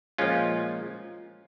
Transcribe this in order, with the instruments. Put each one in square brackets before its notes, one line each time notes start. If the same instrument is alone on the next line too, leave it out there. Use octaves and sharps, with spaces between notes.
[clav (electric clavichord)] A#2 F3 G#3 C#4 F4